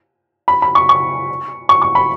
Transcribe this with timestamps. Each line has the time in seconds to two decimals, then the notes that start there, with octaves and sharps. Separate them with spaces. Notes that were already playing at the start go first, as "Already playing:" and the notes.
0.48 B5
0.62 B5
0.75 C#6
0.89 C#6
1.69 C#6
1.82 C#6
1.95 B5